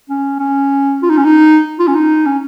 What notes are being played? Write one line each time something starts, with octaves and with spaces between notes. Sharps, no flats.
C#4
C#4
F4
D#4
C#4
D#4
F4
C#4
D#4
C#4